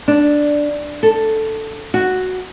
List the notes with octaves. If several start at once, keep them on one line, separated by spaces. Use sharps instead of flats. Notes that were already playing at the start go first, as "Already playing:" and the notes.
D4
A4
F#4